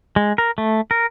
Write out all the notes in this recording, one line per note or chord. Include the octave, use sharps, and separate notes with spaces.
G#3
A#4
A3
A#4